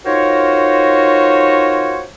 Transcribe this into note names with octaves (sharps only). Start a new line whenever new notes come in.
D#4 F4 F#4 A#4 C5 C#5